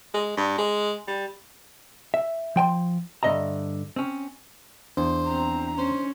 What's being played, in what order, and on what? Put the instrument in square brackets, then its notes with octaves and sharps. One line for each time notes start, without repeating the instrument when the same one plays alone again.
[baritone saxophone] G#3
G2
G#3
G3
[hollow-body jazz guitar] E5
F3 G5 G#5 C6
G2 D3 D#5 E5 A#5
C4 C#4
[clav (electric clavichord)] E2 [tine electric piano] D4 [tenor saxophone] C5
[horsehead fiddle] C4 A#5
[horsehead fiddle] C#4 [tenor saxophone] C5